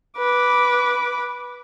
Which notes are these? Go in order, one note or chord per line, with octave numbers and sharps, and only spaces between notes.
B4 D6